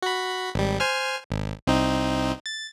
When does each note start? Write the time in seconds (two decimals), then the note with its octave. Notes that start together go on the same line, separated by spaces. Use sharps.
0.02 F#4 B5
0.55 G#1 G3
0.80 C5 G#5 F6
1.30 G#1
1.67 C2 C4 D#4
2.46 A6